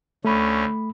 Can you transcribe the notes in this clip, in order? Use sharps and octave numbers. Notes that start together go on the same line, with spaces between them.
D2 A3 C#4 B5